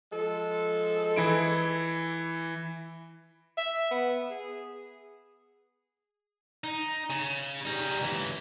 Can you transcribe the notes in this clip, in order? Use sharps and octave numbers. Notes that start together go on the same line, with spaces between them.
F3 G#3 A4
E3 E4 D7
E5
B3
G#4
D#4
C#3
G3 D#4
C#2 E3